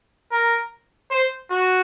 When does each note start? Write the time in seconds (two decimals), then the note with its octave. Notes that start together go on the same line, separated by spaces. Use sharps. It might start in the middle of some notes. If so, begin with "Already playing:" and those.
0.32 A#4
1.11 C5
1.51 F#4